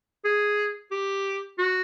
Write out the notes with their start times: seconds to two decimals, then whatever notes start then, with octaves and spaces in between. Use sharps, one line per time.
0.25 G#4
0.91 G4
1.59 F#4